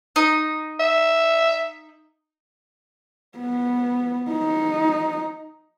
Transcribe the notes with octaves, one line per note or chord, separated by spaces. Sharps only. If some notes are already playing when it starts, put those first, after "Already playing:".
D#4
E5
B3
D#4